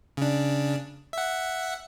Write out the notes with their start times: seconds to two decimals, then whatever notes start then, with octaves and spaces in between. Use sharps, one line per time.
0.17 C#3 D4
1.13 E5 F#5